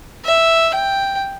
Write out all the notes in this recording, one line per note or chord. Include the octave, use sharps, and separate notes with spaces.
E5
G5